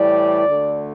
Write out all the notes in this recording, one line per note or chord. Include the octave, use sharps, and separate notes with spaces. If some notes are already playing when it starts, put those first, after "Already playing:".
Already playing: A2 E3 G3 D5
D2 D3 A3